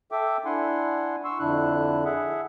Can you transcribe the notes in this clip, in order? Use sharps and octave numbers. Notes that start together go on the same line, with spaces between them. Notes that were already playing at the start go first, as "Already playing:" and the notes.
A4 E5 G5 D6
D4 E4 F#5 G#5 C6
C6 C#6 E6
F2 D3 D4 E4 F#6
G#4 E5 F#5